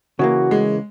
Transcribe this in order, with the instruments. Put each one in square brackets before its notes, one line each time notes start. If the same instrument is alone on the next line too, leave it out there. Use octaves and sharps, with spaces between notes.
[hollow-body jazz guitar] C#3 E3 A#3 [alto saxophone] F#4
[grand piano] G#3